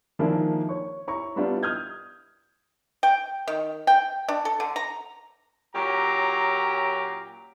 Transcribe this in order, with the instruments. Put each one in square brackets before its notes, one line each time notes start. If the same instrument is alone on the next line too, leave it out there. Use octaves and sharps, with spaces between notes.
[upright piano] D#3 F3 G#3 A#3 D4 E4
C#5 C#6
E4 C#5 A#5 C#6
G3 B3 D4 E4 F4
D#6 F6 G6 G#6
[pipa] G5
D#3
G5
D4
A4
D3
A#5
[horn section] A#2 F#3 C#4 G4 A#5